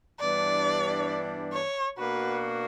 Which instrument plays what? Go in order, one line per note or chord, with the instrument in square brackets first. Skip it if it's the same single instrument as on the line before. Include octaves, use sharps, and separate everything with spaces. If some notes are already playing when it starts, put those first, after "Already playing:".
[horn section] G2 E3 G3 B3 D4 [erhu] D5
[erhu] C#5
[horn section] B2 A#3 D4 F#4 [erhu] B4